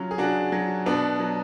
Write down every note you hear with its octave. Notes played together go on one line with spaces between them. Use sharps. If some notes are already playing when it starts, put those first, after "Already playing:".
Already playing: C#3 F#3 C#4 F4
G#4
C#3 D4 F#4
F#3
B2 B3 D4
F#3